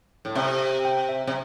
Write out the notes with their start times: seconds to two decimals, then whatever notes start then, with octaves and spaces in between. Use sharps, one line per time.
0.25 A2
0.35 C3 E5
0.60 E5
0.85 G5
1.09 E5
1.27 C3